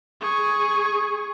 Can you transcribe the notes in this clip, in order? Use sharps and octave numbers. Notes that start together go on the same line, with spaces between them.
G#4 C#6